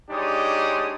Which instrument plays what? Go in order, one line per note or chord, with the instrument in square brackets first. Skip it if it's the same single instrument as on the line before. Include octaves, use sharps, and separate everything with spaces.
[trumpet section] G#3 D4 D#4 G4 C#5 D#6